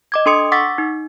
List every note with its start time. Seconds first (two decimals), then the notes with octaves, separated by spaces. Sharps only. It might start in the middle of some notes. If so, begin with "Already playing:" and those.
0.12 D#5 D6 G#6
0.26 D4 A4 C6 D#6 C#7
0.52 F#5 C#6 D6 E6 A6 B6
0.78 D#4